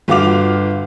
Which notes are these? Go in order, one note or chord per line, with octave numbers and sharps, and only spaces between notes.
G1 F4 F#4 D6 F7